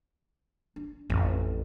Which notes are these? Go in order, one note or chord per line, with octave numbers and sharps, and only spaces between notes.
D4
A1 F2